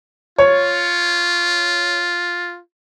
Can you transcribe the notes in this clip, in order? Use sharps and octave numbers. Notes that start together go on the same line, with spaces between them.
F4 C#5